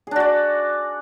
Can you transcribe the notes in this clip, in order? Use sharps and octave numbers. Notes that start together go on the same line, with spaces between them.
D4 F#4 G#4 D5